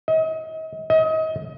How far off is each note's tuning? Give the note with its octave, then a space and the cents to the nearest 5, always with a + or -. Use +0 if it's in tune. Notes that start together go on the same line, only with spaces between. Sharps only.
D#5 +40
D#5 +35